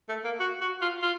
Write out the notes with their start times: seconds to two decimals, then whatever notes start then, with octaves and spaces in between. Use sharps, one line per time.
0.09 A3
0.24 A#3
0.40 F#4
0.61 F#4
0.82 F4
1.02 F4